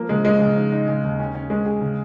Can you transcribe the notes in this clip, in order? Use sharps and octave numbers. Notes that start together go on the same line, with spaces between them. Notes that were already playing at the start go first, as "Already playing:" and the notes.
Already playing: F3 A#3
C#3 G#3
F3 G#3
C#3
D#4
D#4
C#3
D#2
C#4
C#4
G#3 C#4
G#4
C#3